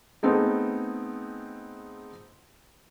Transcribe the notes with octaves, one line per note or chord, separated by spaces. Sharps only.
A3 B3 C4 D#4 G#4